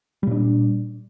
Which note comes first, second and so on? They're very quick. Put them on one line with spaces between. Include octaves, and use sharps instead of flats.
G3 A#2 D4